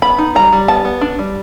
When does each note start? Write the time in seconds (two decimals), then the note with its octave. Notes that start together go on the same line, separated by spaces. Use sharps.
0.02 B3 B5
0.18 D#4
0.35 G3 A#5
0.53 G3
0.68 B3 A5
0.85 B3
1.01 D4
1.19 G3